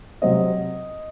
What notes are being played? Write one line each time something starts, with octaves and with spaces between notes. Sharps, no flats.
C3 F#3 C4 D#5